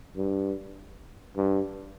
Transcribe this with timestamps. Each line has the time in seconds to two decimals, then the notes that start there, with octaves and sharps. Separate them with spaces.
0.16 G2
1.36 G2